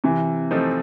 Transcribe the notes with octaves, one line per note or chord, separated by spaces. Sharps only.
C3 E3
F3 A3 C4 D#4